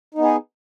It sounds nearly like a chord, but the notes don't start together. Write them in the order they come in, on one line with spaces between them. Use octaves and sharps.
D#4 B3 G#4